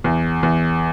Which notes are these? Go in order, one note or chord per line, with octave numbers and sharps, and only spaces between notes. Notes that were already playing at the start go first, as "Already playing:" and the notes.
E2
E2